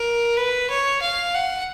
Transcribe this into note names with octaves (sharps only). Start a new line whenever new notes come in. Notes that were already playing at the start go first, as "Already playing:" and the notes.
Already playing: A#4
B4
C#5
F5
F#5